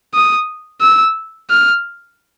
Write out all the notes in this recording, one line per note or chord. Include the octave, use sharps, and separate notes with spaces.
D#6
E6
F6